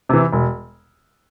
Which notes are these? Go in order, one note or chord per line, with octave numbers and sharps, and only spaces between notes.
C3 E3
E1